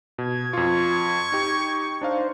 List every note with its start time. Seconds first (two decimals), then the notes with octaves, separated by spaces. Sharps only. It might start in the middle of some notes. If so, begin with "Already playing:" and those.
0.18 B2 G#6
0.53 F2 F4 C#6
1.32 D#4 G4
2.01 D4 D#4 C5 F5